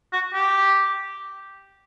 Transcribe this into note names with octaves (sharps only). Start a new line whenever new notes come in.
F#4
G4